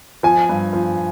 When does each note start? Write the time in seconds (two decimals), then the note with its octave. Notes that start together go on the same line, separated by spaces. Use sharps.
0.23 F3 G#5
0.49 G2
0.73 F3